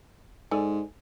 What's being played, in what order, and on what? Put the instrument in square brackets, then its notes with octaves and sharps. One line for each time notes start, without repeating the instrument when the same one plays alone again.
[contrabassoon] G#2 [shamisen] A4 D5 G#5